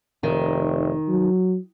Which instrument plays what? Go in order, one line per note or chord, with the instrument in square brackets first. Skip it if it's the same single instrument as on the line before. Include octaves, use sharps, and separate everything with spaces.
[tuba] F1 [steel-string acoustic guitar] D#3
[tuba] F#3